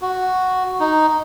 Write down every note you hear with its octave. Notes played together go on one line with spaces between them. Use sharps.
F#4
D#4